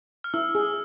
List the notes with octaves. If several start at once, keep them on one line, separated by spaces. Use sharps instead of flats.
F6
E4 E6
G#4